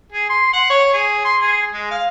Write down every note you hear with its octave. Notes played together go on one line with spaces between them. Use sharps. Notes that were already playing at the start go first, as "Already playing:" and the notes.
G#4
C6
F#5
C#5
G#4
C6
G#4
G#3
F5